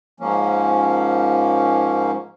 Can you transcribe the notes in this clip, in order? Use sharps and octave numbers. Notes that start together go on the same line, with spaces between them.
G#2 F3 A#3 C#4